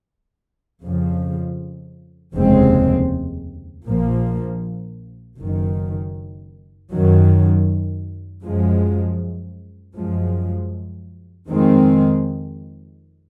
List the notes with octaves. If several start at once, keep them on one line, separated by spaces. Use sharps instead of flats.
F2 C#3 F3
F1 D#2 C#3 G#3 C4
A#1 A#2 F3 A#3
F#1 F#2 D#3
F#2 D#3 F#3
F#2 F3 G#3
F#2 F3 G#3
F2 D#3 G#3 C4